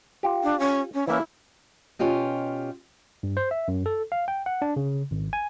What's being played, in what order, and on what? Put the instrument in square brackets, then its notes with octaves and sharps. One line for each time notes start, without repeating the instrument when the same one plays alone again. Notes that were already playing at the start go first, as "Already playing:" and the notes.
[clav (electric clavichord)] F4 G4
[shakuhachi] D4
C#4
C#4
[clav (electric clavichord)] E3 A#3 C#4 [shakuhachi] E4
[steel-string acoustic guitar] B2 C#4 F4 G4 D#5
[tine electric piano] G2
C5
E5
F#2
A4
F5
G5
F#5
D4
C#3
G#1
G#5